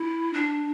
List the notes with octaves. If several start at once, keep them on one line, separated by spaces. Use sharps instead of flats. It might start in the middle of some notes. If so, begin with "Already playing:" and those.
Already playing: E4
D4